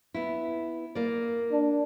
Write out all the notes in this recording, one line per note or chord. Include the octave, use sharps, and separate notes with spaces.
B3 E4
A#3 D5
D4